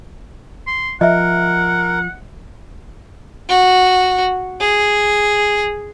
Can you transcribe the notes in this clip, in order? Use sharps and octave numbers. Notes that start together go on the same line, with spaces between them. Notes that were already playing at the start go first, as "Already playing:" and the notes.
C6
F3 A#4 D#5 E5 F#5
F#4
G#4